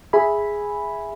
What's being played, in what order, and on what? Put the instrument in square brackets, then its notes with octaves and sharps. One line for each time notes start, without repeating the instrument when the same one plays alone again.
[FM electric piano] G#4 E5 G#5 B5